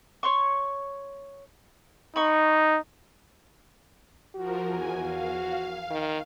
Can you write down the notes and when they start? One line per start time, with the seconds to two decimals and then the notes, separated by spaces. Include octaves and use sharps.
0.23 C#5 C6 C#6
2.16 D#4 B5 C#6
4.36 F3 F#4 A#4
4.66 E2 G#5
5.01 F5
5.91 D#3